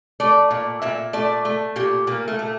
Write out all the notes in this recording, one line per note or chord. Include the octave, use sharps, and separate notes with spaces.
A3 D5
A#2
A#2 E5
A3 D5
A3
A#2 G4
A#2 A#3
A3
A3